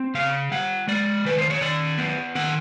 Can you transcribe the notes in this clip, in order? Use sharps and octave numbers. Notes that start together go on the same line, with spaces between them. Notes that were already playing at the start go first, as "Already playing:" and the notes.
Already playing: C4
C#3 F5
G3 F#5
G#3 D5
D#3 B4
C5
C#5
D#3 D5
B3
D#3 F#5